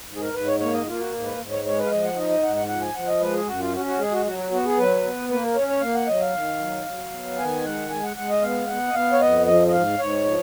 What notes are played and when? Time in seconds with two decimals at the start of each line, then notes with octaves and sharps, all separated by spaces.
0.08 G#2
0.16 G#4
0.21 A#4
0.33 G#2 B4
0.47 C#5
0.60 A#3 C#5
0.73 D#5
0.86 A#3 F4
0.99 F#4
1.13 G#2
1.25 B4
1.38 G#2
1.51 C#5
1.65 G#3 C#5
1.78 B4
1.86 F5
1.91 F3 D#5
2.04 F#5
2.16 D#4 D#5
2.30 D#5
2.43 G#2 F#5
2.56 F#5
2.68 F3 F#5
2.81 G#5
2.94 F3 F#5
3.07 D#5
3.20 G#3 B4
3.34 G#4
3.47 F#2 F#4
3.59 F4
3.73 C#4 F#4
3.86 F#4
3.98 G#3 G#4
4.11 F#4
4.25 F#3 F#4
4.38 F#4
4.51 B3 F#4
4.65 G#4
4.77 F#3 B4
5.03 B3
5.29 A#3 B4
5.42 A#4
5.56 C#4 C#5
5.68 C#5
5.81 A#3 F5
5.94 F#5
6.07 F#3 D#5
6.21 F5
6.34 D#3
6.59 F#3
6.86 F#3
7.12 B3
7.38 D#3 G#5
7.64 G#3 F#5
7.90 G#3 G#5
8.03 F#5
8.16 G#3 F#5
8.30 D#5
8.42 B3 F5
8.68 B3 F#5
8.88 D#5
8.94 B3 F5
9.12 C#5
9.21 F2 D#5
9.46 F3 D#5
9.67 D#5
9.72 G#2 F5
9.99 G#2 C#5
10.24 F3